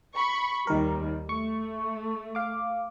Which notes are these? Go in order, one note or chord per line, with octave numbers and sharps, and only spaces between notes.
B5 C#6
D#2 D#3 G3 A#4
A3 C#6
F5 D6